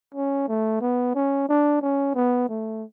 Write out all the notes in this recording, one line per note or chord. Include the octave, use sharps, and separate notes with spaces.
C#4
A3
B3
C#4
D4
C#4
B3
A3